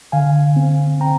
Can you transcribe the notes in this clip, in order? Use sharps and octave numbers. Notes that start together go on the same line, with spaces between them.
D3 F5 G#5
C4
C4 G5 A#5